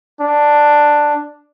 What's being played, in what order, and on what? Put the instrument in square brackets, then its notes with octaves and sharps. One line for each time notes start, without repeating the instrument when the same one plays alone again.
[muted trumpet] D4